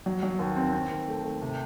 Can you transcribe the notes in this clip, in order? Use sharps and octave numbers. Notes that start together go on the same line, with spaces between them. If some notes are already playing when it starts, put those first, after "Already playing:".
F#3
F#3
D#2
C4
C4
D#2
A3
A3
C3